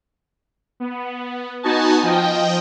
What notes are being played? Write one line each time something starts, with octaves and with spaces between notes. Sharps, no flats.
B3
B3 D#4 F#4 G#5 A5
F3 D#5 G5